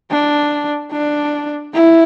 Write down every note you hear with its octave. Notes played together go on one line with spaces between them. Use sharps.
D4
D4
E4